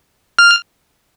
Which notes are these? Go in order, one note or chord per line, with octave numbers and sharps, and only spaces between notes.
F6